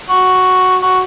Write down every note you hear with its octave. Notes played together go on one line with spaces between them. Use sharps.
F#4
F#4